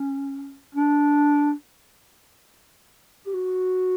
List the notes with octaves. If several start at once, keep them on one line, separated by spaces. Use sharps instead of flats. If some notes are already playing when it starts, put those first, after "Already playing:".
Already playing: C#4
D4
G4
F#4